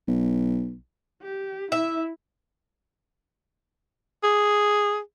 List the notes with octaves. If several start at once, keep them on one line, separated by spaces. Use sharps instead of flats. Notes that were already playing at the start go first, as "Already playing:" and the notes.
B1
G4
E4 E5
G#4